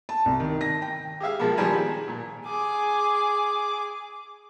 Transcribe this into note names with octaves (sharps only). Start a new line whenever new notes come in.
A5
C2
D#3
A#6
G5
G4 G#4 E5 F5
B2 F3 G#3 A#3 B3
D#3 F3 G3 C5 G#5 A#5
G#3
A#2
G#4 D6